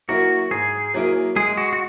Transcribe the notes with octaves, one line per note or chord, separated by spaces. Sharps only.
F#3 A#3 E4 F#4 A#4
G#2 G#4
F#3 A#3 E4 A#4
G#3 G#4
F#4
F#4